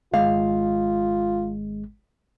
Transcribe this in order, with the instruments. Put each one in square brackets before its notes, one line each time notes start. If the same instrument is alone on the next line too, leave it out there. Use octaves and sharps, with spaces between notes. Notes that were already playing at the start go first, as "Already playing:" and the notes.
[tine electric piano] G#1 G#3 [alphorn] F4 [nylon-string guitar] F5